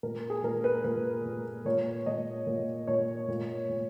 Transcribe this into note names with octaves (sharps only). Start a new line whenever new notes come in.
A#2 A#4
G#4
A#2 A#4
B4
A#2 B4
A#2
A#2 C#5
A#2 D#5
A#2
A#2 C#5
A#2
A#2